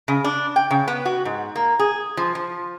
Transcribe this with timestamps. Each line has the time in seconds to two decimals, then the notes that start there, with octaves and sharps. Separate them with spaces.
0.08 C#3
0.24 D4
0.56 G5
0.71 C#3
0.88 B3
1.06 F#4
1.25 G#2
1.56 A#3
1.79 G#4
2.17 F3
2.35 F3